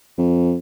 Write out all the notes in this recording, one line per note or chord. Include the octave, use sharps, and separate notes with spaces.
F2